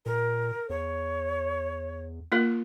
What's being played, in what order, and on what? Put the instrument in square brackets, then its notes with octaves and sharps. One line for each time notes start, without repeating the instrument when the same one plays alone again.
[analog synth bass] A#2 [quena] A#4
[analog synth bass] E2 [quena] C#5
[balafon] A#3 F4 A#4